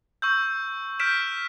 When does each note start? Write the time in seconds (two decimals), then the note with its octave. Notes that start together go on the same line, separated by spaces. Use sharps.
0.22 C#6 E6 G6
1.00 F6 G6 B6 D7 E7